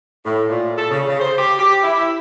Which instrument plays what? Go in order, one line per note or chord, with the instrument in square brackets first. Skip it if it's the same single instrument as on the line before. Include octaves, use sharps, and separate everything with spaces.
[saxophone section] A2
A#2
A4
C#3
C#3
C5
G4
G4
E4